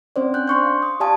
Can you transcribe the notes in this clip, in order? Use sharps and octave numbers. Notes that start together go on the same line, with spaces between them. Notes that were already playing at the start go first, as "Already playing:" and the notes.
C4 C#4 C5 D5
D4 F#6 G6
C6 C#6 G6
F5
D#6
G4 D5 F5 G#5 A5 D#6